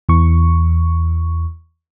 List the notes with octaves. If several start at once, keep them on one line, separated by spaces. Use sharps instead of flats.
E2 E3 C#6